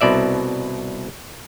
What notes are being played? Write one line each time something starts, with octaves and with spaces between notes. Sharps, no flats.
C2 B2 D5 E5